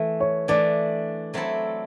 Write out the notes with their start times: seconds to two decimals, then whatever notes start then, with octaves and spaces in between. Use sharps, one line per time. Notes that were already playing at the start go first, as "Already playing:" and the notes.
Already playing: E3 A3
0.20 C#5
0.48 E3 A3 D4 D5
1.34 F#3 A3 C4 E4 A4